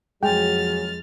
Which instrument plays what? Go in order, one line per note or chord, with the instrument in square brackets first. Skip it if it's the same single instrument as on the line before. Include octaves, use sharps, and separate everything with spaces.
[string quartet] F2 F6 A6 [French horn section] F#3 G#4 [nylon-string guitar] G#3 [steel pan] G5 G#5